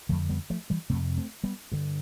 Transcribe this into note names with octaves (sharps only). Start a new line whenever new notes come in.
F2 D3 F3 A3
G3 B3
F3 A3
E3 G3
F2 C3 A3 C4
A3 C4
G3 B3
G2 D3